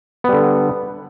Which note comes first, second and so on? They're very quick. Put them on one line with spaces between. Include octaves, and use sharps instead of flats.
B3 G3 D3